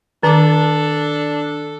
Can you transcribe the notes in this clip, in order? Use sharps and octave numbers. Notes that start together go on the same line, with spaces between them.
D#3 D4 A4 D6